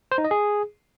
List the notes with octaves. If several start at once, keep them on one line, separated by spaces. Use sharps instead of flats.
C5
D#4
D#5
G#4